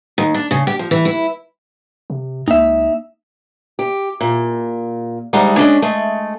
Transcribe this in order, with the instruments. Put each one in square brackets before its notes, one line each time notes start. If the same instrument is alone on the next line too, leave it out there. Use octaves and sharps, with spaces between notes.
[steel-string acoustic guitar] D#2
D4
C#3
G4
F3
E3
E4
[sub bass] C3
[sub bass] C#2 [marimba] A#3 [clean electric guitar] D#4 E5
[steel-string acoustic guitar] G4
A#2
D2 G3 G#3 D#4 F#5
G#3 C#4 D4
G#3 A3